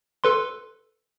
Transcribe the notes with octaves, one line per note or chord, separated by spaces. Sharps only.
A4 B4 C6